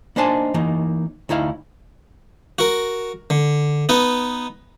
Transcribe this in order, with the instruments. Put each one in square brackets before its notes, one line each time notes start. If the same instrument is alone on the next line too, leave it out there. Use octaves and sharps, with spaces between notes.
[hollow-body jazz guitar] A#3 D4 D#4 C5 G#5 A5
E3 A#3 D#4
D2 D#4 E4 F5
[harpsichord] F#4 A#4
D3
B3 D#4 B4